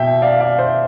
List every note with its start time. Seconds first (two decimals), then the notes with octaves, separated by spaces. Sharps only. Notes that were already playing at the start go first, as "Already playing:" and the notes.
Already playing: B2 E5 G5
0.22 D5 F5
0.40 D5 F5
0.59 C5 E5